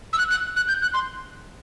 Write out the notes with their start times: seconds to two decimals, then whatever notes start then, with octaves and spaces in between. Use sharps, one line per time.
0.13 E6
0.18 F#6
0.31 F#6
0.56 F#6
0.68 G6
0.82 F#6
0.94 C6